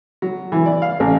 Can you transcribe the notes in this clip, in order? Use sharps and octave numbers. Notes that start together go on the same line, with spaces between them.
F#3
E3
D5
F5
A1